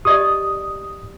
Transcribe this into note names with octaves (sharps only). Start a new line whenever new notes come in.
G4 D5 D#5 D#6